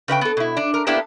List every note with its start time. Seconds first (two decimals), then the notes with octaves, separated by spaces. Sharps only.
0.08 C#3 B4 D#5 G5
0.21 B3 A4
0.37 B2 E4
0.57 D4
0.74 A#4
0.87 A#3 B3 D4 E4 G4 A4